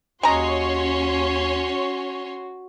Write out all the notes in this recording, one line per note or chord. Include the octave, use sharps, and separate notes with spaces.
D#2 G#3 C#4 F#4 C#5 A#5 C6